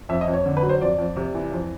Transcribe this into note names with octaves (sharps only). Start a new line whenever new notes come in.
F2 E5
D#5
F2
C#5
D3
B4
F#3
C5
F2 D5
F2
C3
E3
F2